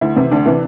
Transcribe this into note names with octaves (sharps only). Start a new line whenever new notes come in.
D2 E4
C3 E3
D2 D4
C3 E3